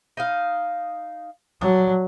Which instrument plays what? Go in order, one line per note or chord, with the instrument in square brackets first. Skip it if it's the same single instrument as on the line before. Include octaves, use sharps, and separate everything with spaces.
[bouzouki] D#4 D#5 F5
[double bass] F#3 [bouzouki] D4